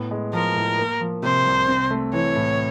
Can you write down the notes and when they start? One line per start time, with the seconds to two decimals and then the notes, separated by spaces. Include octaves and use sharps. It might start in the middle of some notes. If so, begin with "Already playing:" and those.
Already playing: A2 B3
0.11 G#3
0.33 F3 A#4
0.56 A2
0.78 A#3
1.01 F3
1.23 C3 C5
1.46 C2
1.68 C4
1.91 A3
2.13 E3 C#5
2.36 A2